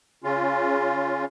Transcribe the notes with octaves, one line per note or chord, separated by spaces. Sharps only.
C#3 C#4 F4